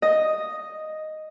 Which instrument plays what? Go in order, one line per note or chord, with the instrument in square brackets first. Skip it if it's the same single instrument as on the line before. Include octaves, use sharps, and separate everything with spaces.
[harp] D#5